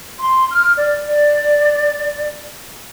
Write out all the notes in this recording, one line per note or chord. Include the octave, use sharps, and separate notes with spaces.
C6
F6
D5
D5